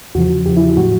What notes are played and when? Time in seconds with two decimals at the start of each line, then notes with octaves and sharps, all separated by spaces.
0.15 E2 C#3 F3 F#4
0.46 E2 C#3 F3 G4
0.57 E4
0.77 A2 F#3 F#4